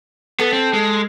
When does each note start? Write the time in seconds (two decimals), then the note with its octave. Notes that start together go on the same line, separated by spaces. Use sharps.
0.40 B3 A4
0.53 C4
0.73 G#3